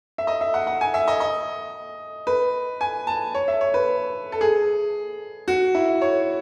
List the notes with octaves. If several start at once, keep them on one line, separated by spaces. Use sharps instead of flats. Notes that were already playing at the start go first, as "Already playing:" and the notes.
E5
D#5
E5
F#5
F#5
G#5
E5
D#5
D#5
B4
G#5
A5
C#5
E5
C#5
B4
A4
G#4
F#4
E4
C#5